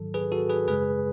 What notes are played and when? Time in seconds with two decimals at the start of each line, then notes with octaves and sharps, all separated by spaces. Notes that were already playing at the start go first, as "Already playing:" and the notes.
Already playing: G#2 D#3 F#3 A4
0.14 G#4 B4
0.32 F#4 A4
0.49 G#4 B4
0.68 F#2 C#3 G#3 G#4 B4